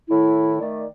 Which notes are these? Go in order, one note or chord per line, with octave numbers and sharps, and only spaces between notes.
A2 D#3 E4
D#3 A3 D5